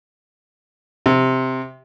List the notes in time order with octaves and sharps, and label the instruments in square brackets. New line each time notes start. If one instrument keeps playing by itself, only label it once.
[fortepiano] C3